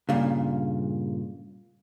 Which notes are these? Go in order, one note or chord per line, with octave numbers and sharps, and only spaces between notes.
G2 A#2 C#3